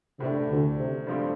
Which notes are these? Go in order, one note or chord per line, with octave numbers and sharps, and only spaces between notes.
A2 C3 A3 D4
D2 D3
C3
G2 F3 A3 C4 G4